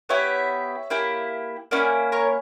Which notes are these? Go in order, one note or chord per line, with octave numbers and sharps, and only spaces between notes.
B3 E4 G4 C#5 E5
A#3 E4 G4
A#3 C#4 E4 D5 F#5
A#4 C#5